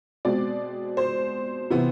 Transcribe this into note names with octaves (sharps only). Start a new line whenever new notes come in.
B2 G#3 C4 D5
C5
C3 E3 B3